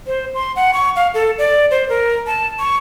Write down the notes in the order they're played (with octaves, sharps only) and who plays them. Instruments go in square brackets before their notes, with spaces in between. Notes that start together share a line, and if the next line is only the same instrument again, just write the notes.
[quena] C5
C6
F#5
C#6
F5
A4
D5
C5
A#4
A5
C#6